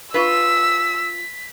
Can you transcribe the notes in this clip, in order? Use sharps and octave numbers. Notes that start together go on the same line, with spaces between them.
F4 B4 E6 B6